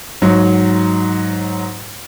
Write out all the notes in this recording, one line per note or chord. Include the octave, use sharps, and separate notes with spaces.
G#2 F#3